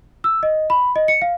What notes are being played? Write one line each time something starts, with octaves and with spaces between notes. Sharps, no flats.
E6
D#5
B5
D#5
C#7
F5